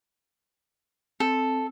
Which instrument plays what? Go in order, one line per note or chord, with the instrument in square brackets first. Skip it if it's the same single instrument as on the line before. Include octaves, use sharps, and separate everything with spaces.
[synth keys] C4 [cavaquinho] A4